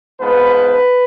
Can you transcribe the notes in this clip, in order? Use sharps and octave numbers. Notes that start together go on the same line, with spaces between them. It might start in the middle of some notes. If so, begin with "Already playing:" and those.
G#2 F3 B3 B4